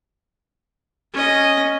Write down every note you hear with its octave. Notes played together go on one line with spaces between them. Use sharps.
C#4 D#5